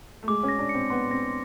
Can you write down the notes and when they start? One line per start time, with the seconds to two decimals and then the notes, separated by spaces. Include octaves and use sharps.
0.23 A3
0.28 G#3 D6
0.43 C#4
0.48 A#6
0.59 D4
0.69 C4 C#7
0.90 B3 C6
1.11 C4 A#6